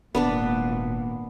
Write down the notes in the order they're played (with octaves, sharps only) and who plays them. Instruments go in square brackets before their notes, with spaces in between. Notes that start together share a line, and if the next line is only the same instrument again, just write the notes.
[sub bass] D#1 [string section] G#1 A#2 [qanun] B3 D4 B4